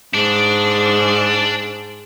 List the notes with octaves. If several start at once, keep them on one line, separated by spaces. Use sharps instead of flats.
G#2 D4